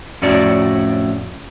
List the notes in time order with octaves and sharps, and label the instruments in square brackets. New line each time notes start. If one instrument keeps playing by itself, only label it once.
[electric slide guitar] F2 A2 C#4 F#4 D5